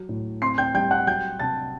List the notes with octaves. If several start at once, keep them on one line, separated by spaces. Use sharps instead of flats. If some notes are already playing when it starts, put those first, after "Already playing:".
Already playing: F#3
A2
C4 C6 C7
G5 G6
G3 G5 G6
F#5 F#6
F#3 G5 G6
C3 A5 A6